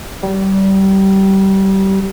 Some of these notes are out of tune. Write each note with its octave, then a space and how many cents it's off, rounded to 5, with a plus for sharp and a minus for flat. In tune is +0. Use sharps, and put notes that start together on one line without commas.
G3 -25